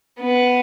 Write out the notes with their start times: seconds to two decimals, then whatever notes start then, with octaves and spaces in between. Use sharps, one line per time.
0.20 B3